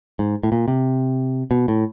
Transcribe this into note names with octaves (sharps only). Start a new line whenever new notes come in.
G#2
A2
A#2
C3
B2
A2